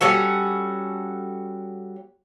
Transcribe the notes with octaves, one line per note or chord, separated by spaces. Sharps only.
G3 C#4 F#4 A4